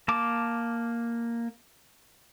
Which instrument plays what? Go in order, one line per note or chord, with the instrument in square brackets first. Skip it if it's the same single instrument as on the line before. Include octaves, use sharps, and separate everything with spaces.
[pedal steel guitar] A#3 A5 D6